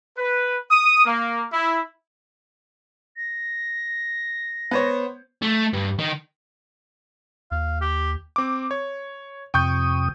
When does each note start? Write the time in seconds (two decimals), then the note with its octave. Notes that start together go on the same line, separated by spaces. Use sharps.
0.18 B4
0.70 D#6
1.06 A#3
1.53 E4
3.17 A#6
4.71 B3 C5 C#5
5.42 A3
5.73 G2
5.99 D#3
7.51 D#2 F5
7.81 G4
8.36 C4 D6
8.71 C#5
9.54 F2 C3 G5 C#6 D#6 G6